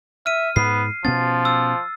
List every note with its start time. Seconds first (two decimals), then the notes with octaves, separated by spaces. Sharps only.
0.26 E5 F6 D#7
0.56 G#2 B3 C7
1.05 B2 F3 B3 C#4 A6
1.45 E6